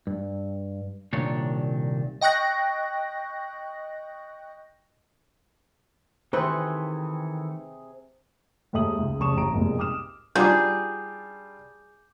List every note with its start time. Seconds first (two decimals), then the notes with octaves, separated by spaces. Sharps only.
0.07 G2
1.13 C2 A#2 D#3 D4 C#5
2.21 D#5 G5 C#6 F#6 A#6
6.33 C3 D#3 E3 A3 G4 G#4 B4 C5
8.73 D#2 G#2 A4 E5 D#6 F#7
8.98 C#2
9.20 F1 C#3 A5 C#6 D#6 E7
9.36 A1 A2 A#5 D7
9.53 C2 F2 G#2 B2 A#3
9.79 D6 D#6 F6 E7
10.35 G3 D4 D#4 F4 F#4 G#4 D6 G6